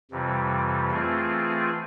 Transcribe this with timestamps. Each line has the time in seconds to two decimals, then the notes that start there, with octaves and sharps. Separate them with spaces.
0.11 F2 C3 E3 G3
0.91 E3 A3 C4 F4 G#4